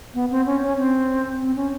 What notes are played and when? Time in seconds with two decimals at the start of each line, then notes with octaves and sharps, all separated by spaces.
0.14 B3
0.31 C4
0.46 C#4
0.62 C#4
0.78 C4
1.41 C4
1.56 C#4